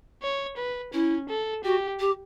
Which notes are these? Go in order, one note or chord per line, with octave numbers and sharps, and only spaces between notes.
C#5
B4
C#4 E4
A4
F#4 G4
G4